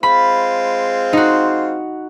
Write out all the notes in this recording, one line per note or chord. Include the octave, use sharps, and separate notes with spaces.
G#3 C4 F4 B5
D#4 F#4